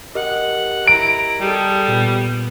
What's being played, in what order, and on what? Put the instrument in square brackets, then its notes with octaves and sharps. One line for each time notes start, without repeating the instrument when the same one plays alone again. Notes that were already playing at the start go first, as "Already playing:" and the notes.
[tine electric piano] G4 A#4 D#5 [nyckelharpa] F#5
[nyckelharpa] E4 A#5 [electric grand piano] D7
[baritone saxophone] G3 [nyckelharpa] G#4 A4
[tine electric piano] A#2 [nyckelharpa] B3